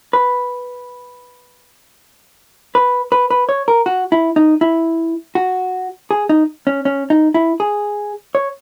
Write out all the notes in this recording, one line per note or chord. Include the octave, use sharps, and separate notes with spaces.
B4
B4
B4
B4
C#5
A#4
F#4
E4
D#4
E4
F#4
G#4
D#4
C#4
C#4
D#4
E4
G#4
C#5